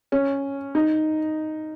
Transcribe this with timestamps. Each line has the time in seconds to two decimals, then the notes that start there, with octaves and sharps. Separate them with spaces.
0.12 C#4
0.75 D#4